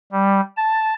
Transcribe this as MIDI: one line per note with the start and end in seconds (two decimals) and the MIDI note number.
0.12 0.40 55
0.57 0.94 81